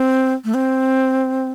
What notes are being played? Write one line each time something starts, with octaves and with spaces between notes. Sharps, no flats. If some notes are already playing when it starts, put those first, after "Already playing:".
Already playing: C4
A3
C4